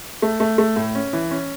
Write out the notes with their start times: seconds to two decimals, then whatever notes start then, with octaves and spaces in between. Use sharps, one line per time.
0.22 A3
0.40 A3
0.58 A3
0.76 A2
0.95 C#4
1.13 E3
1.31 C#4